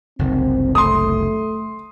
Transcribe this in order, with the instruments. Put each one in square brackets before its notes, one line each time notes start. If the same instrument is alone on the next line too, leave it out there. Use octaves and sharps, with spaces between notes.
[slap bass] F#1 C2 D#3 [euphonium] C4
[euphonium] A3 [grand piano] C6 D#6